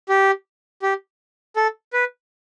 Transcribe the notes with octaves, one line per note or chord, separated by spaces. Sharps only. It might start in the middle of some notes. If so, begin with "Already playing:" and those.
G4
G4
A4
B4